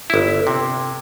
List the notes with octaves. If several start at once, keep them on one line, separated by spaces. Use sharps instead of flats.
G1 E4
C3